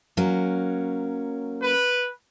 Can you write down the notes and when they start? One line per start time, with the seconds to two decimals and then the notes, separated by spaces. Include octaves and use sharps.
0.17 F#3 A#3 C#4
1.62 B4